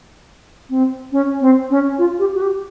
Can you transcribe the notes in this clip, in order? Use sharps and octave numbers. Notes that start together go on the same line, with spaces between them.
C4
C#4
C4
C#4
F4
G4
F#4
G4